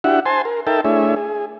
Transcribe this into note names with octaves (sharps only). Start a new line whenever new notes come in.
D4 E4 F#4 G4 E5 F#5
C5 G#5 A5 C6
A#4
D#4 A4 A#4 E5 G5 A5
A3 D4 E4 G#4 C#5 E5
G#4